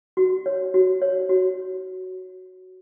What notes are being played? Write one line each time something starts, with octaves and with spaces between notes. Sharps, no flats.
F#4
C#5
F#4
C#5
F#4